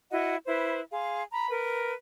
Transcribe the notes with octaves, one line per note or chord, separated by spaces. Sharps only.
E4 F#4 D#5 F#5
E4 B4 C5
G#4 F5 C6
A#5 B5
A#4 B4